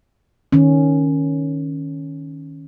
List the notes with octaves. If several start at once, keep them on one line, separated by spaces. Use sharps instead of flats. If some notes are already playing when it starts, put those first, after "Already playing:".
D#3 C#4